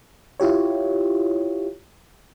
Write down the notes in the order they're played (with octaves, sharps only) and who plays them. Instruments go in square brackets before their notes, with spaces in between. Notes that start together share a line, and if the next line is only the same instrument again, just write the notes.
[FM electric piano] E4 F4 G4 C#5